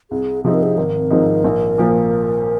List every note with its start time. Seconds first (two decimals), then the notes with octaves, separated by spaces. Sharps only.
0.11 C2 G#4
0.44 C3 F3 C4 D#4 G#4
0.54 A#4
0.63 G#4
0.77 G#1 A#4
1.11 G#2 F3 C4 D#4
1.44 A#1
1.78 A#2 F3 A#3